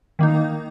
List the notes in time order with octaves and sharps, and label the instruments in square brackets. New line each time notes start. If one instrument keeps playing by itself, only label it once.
[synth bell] D#3 A#3 D#4